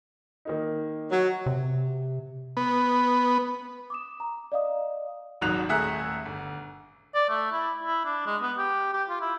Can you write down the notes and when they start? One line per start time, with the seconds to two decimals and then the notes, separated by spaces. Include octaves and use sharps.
0.45 D#3 A#3 D#4
1.10 F#3
1.46 C3
2.57 B3
3.90 D6 D#6 E7
4.20 A#5
4.52 D5 D#5 F5 D#6
5.41 D#1 G#1 G#2 F#3 F#6 F7
5.69 D#1 A3 G#4 E5 A#5 F#6
6.25 G1
7.15 D5
7.29 A3
7.52 E4
7.84 E4
8.05 D4
8.27 G#3
8.43 B3
8.58 G4
8.93 G4
9.09 F4
9.21 E4